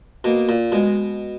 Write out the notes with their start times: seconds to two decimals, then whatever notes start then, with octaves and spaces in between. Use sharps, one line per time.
0.24 B2 A#3
0.49 A#2
0.71 B2 G#3